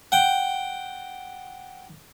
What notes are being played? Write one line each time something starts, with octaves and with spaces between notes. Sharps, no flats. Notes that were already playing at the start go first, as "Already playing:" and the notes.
F#5 G5